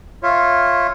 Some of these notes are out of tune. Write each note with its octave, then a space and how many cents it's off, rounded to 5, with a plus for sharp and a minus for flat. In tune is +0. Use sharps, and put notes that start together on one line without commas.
F4 +0 C#5 -15 E5 +0